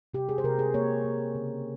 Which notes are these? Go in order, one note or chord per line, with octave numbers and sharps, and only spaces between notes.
C3 G4
G#4
C5
C3 A#4
G#4
A#3 C#5
A#3
C#3